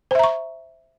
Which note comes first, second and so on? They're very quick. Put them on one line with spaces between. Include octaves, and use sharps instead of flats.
C5 E5 A#5 C#6